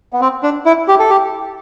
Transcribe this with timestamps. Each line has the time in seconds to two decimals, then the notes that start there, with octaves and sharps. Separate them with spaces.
0.13 B3
0.21 C4
0.43 D4
0.66 E4
0.88 G4
0.99 A4
1.10 G4